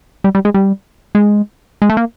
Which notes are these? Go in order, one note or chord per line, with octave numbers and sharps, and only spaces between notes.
G3
G3
G#3
G3
G#3
G#3
A3
A#3